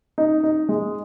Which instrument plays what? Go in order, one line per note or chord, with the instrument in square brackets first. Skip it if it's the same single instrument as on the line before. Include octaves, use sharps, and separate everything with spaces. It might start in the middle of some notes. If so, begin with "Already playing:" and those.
[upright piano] D#4
D#4
G#3